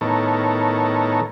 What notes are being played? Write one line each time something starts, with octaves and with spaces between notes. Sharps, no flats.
A2 D#3 B3 A4 A#4 C#5